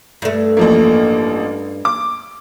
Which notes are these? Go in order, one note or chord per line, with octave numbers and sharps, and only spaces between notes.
G2 A3
A1 F3 A#3
D6